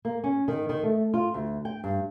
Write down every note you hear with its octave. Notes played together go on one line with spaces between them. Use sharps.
A#3
C#4
D#3
D#3
A3
F4
D2
G5
G2